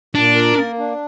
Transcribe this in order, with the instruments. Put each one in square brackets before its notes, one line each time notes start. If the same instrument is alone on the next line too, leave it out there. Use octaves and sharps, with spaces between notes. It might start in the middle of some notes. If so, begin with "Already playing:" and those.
[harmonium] A#2 [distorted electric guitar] D4
[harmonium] A#4
A#3
D4